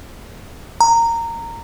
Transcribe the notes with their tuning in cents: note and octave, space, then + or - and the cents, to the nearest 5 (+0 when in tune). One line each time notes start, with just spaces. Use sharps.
A#5 -15